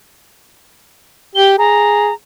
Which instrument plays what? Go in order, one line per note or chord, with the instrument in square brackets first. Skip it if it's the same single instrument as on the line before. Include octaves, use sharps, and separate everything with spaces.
[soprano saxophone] G4 [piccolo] G7
[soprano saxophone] G#4 [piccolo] A#5